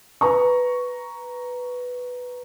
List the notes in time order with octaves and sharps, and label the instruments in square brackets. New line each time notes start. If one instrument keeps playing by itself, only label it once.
[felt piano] B4 A#5 C#6